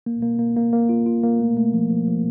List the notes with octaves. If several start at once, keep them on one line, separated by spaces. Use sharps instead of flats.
A#3
A#3
A#3
A#3
A#3
F4
F4
A#3
A3
A3
F3
F3
F3